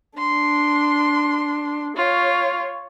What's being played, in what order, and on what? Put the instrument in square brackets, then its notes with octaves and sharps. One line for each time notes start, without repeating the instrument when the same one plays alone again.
[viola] D4 [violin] C6
[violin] F4 [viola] C#5